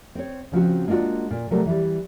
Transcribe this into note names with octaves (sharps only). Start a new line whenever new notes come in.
C4 C#5
C#3 F3 C4 F#4
G#3 A#3 D4 F4 F#4
A#2
C3 F#3 G3 A3 A#4
E3 G3